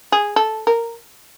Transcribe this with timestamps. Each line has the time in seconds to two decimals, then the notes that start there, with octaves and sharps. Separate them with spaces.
0.12 G#4
0.36 A4
0.67 A#4